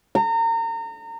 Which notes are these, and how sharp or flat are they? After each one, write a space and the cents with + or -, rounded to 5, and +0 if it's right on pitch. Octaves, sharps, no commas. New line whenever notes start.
A#5 -30